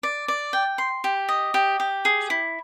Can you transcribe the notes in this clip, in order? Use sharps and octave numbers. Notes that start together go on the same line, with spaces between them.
D5
D5
G5
C6
G4
D#5
G4
G4
G#4
E4